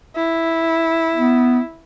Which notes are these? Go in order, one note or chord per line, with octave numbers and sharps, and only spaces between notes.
E4
B3